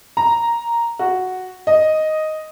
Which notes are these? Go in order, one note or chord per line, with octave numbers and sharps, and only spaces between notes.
A#5
F#4
D#5